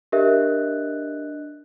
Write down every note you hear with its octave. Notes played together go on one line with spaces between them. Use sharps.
D4 G4 A#4 D#5 E5 F#6